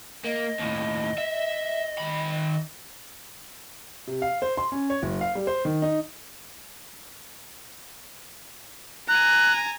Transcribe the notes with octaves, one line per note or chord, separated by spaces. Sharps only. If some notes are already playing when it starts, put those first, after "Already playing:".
A#3 D#5
D#2 A2
E5
D#3 B5
C3
F5
C5
C6
C#4
C#5
F#1
F5
G3
C5
D#3
D#4
G#5 A#5 F#6